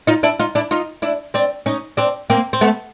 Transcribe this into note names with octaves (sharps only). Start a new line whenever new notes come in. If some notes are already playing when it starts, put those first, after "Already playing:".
D#4 F4
D4 E4
D#4 F4
D4 E4
D#4 F4
D4 E4
C4 D4
C#4 D#4
C4 D4
A#3 C4
C4
A3 B3